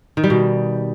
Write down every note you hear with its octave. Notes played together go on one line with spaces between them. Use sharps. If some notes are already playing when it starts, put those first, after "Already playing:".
D#3
G3
B2